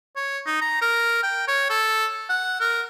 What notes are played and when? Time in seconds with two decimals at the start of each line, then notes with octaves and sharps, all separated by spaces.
0.16 C#5
0.46 D#4
0.61 A#5
0.82 A#4
1.23 G5
1.48 C#5
1.70 A4
2.29 F#5
2.60 A#4